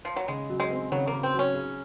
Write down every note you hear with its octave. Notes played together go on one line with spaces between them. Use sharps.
F3
F#3
C#3 G#3
F#3
G#3
C4
C#3 F#3
C#3 A#3
C4
F#3 C#4
G#4